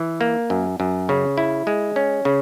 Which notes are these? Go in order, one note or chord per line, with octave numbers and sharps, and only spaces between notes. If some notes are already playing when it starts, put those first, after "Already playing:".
Already playing: E3
A#3
F#2
F#2
C#3
E4
G#3
C#4
C#3